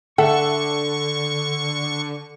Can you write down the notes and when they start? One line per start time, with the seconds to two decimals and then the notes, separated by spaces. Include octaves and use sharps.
0.18 D3 A4 E5 F#5 C#6